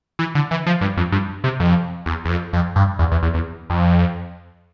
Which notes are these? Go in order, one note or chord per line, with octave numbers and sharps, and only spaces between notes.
E3
D3
E3
F3
G2
F2
G2
C3
F2
E2
E2
F2
F2
G2
E2
E2
E2
E2
F2